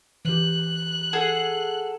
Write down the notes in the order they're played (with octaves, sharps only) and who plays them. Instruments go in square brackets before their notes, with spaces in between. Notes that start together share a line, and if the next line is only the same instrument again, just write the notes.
[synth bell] E3 G4 [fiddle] F#6
[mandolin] G#4 A4 F#5